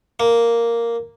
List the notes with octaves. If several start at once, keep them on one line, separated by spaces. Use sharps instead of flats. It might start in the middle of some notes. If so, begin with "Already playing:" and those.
A#3